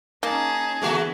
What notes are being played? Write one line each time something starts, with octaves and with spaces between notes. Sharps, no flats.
A#3 C#4 D#4 G#4 A5
D3 E3 G#3 A3 B3 F#4